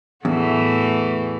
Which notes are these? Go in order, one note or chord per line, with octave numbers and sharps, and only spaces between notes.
E2 A2 E3 A3 F#4